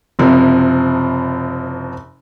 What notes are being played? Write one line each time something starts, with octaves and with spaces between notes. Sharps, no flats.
F#1 C3 F3